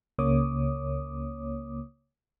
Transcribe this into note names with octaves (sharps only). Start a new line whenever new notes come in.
C#2 C#3 A#3 C#5 D6 D#6